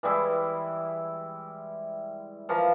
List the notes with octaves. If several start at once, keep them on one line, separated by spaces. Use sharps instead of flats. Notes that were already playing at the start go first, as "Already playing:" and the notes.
E3 G3 G#3 E4
E3 F3 A#4